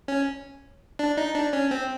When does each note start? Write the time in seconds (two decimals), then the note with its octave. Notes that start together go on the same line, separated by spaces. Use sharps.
0.08 C#4
0.99 D4
1.18 D#4
1.35 D4
1.53 C#4
1.71 C4